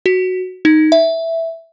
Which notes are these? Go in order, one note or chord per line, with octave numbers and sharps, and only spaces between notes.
F#4
D#4
E5